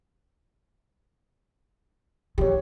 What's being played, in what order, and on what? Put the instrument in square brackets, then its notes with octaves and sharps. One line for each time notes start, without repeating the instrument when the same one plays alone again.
[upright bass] D#3 E3 [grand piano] G4 C#5